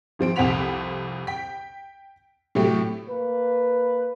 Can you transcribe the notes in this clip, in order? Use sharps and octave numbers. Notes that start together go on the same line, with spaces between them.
G#1 F3 C4 D7
C2 F2 C4 F#5 B6 F7
G5 B6
A2 C3 F#3 A3 G4
A#3 B4